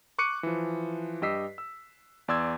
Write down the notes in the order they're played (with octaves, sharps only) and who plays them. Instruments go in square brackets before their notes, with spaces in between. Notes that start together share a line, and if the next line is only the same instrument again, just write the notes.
[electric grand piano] C#6 D6 F#6 C#7 D#7
E3 F3
G2 G4 D#5 E6 B6 C7
E6
E2 D5 C6 E6 G#6